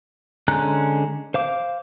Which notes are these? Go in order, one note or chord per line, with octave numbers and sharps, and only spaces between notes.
D3 G#3 C#4 A#5 F#6
C5 F5 D6